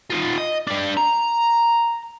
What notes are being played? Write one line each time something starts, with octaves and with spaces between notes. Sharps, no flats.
D#4 F4
D#5
G3 D4
A#5